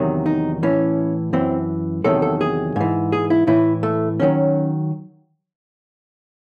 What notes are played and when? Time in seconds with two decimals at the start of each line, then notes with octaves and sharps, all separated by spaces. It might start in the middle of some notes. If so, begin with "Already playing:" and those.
Already playing: E2 C3 D#3 F#3
0.26 D#4
0.63 A2 E3 C#4
1.33 F#2 E3 C4
2.04 E2 C3 D#3 F#3 A4
2.22 A4
2.41 G#4
2.76 G#2 E3
3.12 G#4
3.30 E4
3.47 A2 E3 E4
3.83 A3
4.20 D#3 F#3 C#4